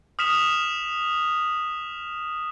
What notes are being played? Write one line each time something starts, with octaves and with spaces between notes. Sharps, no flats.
D#6 F6 B6 E7 F7